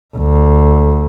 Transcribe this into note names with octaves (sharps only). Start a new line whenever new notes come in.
D2